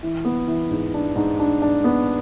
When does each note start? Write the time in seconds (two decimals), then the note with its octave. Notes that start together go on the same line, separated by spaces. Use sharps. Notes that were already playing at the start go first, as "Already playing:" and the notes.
0.03 E3
0.25 B3
0.47 E3
0.71 G#2
0.94 D4
1.16 G#2
1.39 D4
1.62 D4
1.84 B3